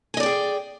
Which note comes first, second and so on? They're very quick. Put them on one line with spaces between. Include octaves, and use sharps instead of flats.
G#5 D#5 D5 G5 G#4